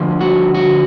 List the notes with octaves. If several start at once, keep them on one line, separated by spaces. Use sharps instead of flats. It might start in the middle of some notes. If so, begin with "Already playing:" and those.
Already playing: D2 D3 F3
F#4
F#4